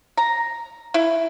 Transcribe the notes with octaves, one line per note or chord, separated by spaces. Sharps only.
A#5
E4